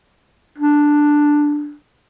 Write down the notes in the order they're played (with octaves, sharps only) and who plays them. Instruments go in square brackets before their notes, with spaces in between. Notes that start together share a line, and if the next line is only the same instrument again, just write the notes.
[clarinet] D4